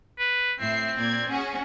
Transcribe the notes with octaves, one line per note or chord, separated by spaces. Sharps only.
B4
A2 C4 E5 C7
A#2 D5 G#6
C#4 F#4 G#4